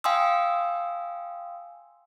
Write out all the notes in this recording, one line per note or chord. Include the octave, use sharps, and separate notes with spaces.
F5 G5 G#5 C6 D#6 E6